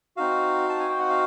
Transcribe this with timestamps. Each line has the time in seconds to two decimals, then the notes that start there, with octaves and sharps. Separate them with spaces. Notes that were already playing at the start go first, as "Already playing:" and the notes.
0.17 C4 D#4 F#4 F5
0.69 A5
0.79 G#5
0.89 G5
1.00 F#5
1.09 F5